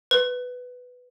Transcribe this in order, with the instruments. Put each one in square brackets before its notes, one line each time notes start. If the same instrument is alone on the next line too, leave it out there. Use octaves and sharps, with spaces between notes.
[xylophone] B4